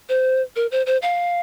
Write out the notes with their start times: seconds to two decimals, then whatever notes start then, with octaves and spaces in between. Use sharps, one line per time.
0.09 C5
0.56 A#4
0.71 C5
0.86 C5
1.02 F5